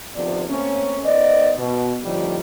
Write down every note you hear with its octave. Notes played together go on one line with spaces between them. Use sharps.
D2 C3 D#3 F3 B3 D5
A3 A#3 C4 C#4
D#3 B3 C5 D5 D#5
B2
F2 A2 D3 D#3 F3 G3